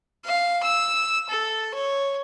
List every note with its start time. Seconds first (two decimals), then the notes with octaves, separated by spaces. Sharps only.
0.25 F5
0.63 E6
1.29 A4
1.74 C#5